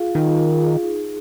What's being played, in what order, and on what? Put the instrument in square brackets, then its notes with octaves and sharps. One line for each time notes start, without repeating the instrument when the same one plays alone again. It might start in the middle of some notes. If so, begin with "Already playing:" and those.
Already playing: [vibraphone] F4 G#4 F5
[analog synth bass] D#3 [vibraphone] F4
[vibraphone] F4
G#4
D#4